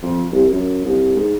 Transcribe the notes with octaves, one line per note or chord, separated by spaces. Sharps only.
F2
C2
F#2
C2
G#2